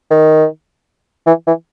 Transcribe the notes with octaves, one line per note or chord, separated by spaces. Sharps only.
D#3
E3
E3